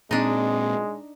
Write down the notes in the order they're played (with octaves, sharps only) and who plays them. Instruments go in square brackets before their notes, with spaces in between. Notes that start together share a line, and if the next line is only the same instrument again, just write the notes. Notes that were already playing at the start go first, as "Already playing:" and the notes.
[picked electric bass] A#2 C4 [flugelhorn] G#3 [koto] D4 D#4